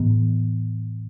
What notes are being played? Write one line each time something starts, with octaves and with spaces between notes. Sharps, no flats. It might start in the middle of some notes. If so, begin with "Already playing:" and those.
Already playing: A2 E3 B3